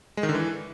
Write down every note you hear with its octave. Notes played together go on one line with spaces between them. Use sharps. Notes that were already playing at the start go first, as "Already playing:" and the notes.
G#3
D#3
D3
E3